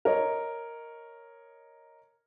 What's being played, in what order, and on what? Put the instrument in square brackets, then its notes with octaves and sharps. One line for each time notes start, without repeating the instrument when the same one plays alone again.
[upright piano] A#4 C#5 D#5